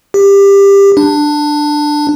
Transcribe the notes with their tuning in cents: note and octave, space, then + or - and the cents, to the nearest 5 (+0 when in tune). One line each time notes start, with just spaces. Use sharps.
G4 +20
D4 +15